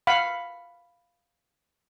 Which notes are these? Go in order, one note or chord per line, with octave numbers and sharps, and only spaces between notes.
F5 F#5 B5